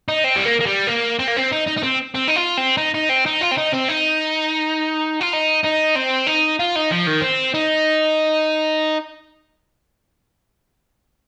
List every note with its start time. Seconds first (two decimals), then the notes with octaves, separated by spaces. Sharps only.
0.08 D#4
0.24 C4
0.36 G3
0.45 A#3
0.60 A#3
0.66 G3
0.87 A#3
1.19 C4
1.28 A#3
1.36 C4
1.52 D#4
1.67 D#4
1.77 D#4
1.83 C4
2.15 C4
2.27 D#4
2.36 F4
2.57 C4
2.77 D#4
2.94 D#4
3.10 C4
3.26 D#4
3.42 F4
3.52 C4
3.58 D#4
3.74 C4
3.89 D#4
5.21 F4
5.33 D#4
5.63 D#4
5.95 C4
6.27 D#4
6.60 F4
6.76 D#4
6.92 F3
7.08 D#3
7.22 C4
7.55 D#4